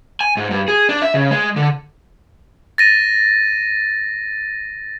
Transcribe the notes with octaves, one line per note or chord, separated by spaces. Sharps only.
G#5
G#2
G2
G#4
D4
E5
C#3
G#3
D3
A6 A#6 D#7